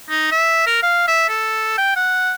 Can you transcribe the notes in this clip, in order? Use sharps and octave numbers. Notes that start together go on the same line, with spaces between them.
D#4
E5
A#4
F5
E5
A4
G5
F#5